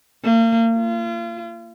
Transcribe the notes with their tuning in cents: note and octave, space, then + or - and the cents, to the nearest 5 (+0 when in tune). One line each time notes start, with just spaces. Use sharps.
A#3 -35
F4 -35